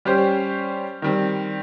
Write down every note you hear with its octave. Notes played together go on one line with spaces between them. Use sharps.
G3 C#4 G4 C5
D#3 G3 C4